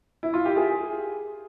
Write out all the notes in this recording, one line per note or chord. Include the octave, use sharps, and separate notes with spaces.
E4
F4
G4
G#4